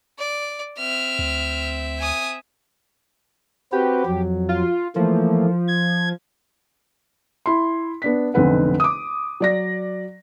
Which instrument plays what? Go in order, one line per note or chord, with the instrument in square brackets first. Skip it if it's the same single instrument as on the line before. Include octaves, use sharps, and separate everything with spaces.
[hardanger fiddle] D5
[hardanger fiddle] C4 E5 [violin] F6
[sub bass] D2
[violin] G#5 D#6
[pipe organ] C4 F#4 B4 [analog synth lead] G4
[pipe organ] F2 F#3
[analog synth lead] F4
[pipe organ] E3 A3 A#3 [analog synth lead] F3
[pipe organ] G#6
[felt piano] E4 C6
B3 D4 B6
F1 B1 D3 C4 B4 F#5
D6 D#6
F#3 D5 A#6